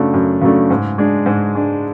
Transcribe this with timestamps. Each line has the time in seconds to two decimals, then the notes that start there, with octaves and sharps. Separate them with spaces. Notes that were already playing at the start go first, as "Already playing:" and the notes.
Already playing: F#2 C#3 F#3 A3 D4
0.14 F#2
0.41 C#3 F#3 A3 D4
0.70 G#2
0.98 G#3 D4
1.26 G#2
1.55 G#3 D4